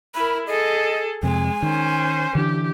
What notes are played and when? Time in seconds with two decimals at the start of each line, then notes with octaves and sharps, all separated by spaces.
0.15 E4 A#4 B5
0.47 G#4 A4 D#5
1.23 F2 C3 G#3 G#5
1.62 D#3 C#4 C5
2.35 D3 E3 D4 G4